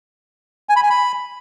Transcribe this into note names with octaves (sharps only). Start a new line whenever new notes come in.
G#5
B5
G#5
B5